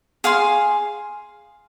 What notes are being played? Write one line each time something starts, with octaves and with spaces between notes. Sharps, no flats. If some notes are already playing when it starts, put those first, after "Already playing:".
G#4 F5 G#5 C6